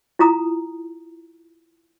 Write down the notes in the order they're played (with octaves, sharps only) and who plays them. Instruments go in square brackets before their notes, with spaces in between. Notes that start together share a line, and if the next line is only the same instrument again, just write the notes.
[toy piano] E4 F4 A#5 D#6